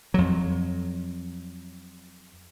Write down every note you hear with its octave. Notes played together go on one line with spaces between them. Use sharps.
F2 F#3